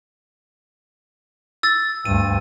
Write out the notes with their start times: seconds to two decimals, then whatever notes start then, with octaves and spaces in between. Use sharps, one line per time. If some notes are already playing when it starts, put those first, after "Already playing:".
1.63 E6 A6
2.05 D2 G2 D#7